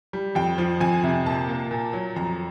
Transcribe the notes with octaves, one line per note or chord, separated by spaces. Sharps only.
G3
F2 G5
F3
F2 G#5
C3
A#2 A5
A#3
A#2
F#3
F2 A#5